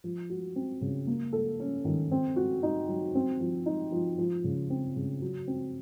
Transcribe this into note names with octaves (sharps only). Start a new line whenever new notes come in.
F3
F#4
C4
C#3
A#3
A4
C#4
D#3
C4
F#4
D#4
F#3
C4
F3
D#4
F3
F3
C#3
C4
C#3
F#3
C4